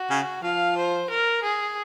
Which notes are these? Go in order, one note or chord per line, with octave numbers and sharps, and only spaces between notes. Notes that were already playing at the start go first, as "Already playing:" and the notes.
Already playing: F#4
C#3
F3 F5
C5
A#4
G#4